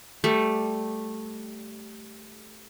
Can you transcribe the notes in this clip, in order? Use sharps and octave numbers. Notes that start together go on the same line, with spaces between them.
G3 A3